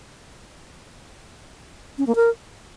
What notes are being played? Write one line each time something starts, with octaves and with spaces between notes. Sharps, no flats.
C#4
A#3
A#4